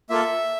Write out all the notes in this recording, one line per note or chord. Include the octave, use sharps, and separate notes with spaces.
A#3 F4 A4 E5